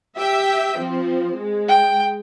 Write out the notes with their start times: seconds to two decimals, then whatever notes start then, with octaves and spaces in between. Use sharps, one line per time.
0.17 G4 E5 G5
0.77 F3 C4
1.37 G#3
1.69 G5